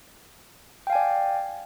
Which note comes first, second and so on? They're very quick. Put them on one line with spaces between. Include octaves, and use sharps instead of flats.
G5 F5 G#5 D5